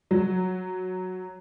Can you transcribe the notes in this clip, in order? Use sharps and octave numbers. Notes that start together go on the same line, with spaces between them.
F#3